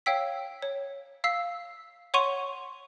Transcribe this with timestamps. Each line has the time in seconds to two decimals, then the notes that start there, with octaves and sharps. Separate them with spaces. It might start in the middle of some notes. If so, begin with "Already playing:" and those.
0.06 C#5 F5 G5 E6 B6
0.62 C#5
1.24 F5 E6 B6 C7
2.14 C#5 F#5 C6 C#6 D#7 F7